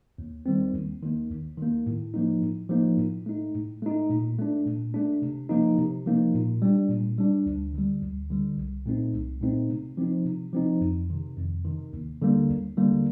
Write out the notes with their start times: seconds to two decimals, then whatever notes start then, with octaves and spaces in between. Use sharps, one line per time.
0.18 D#2
0.46 D#3 G3 C4
0.74 D#2
1.03 D#3 A#3
1.30 D#2
1.58 D#3 A#3
1.86 A2
2.14 F3 A#3 D#4
2.42 A2
2.69 F3 A#3 D#4
2.98 A2
3.26 A3 D#4
3.55 A2
3.82 A3 D#4
4.10 A#2
4.38 A3 D4
4.66 A#2
4.94 A3 D4
5.22 C3
5.49 F3 A#3 D#4
5.78 C3
6.06 F3 A#3 D#4
6.34 A#2
6.62 G3 D4
6.89 A#2
7.18 G3 D4
7.46 D2
7.73 D3 G3
8.02 D2
8.30 D3 G3
8.57 C2
8.86 A#2 A3 C4 D#4
9.14 C2
9.41 A#2 A3 C4 D#4
9.70 C3
9.97 F3 C4 D#4
10.26 C3
10.53 F3 C4 D#4
10.81 F2
11.10 C3 D#3
11.37 F2
11.65 C3 D#3
11.93 D#2
12.22 D3 G3 A#3
12.49 D#2
12.77 D3 G3 A#3